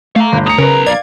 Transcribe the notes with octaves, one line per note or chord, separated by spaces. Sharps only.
A3 F5 A#5
G1
B1 A#5 D#6 C#7
C#3 A#4 B4
D5 F5 G#6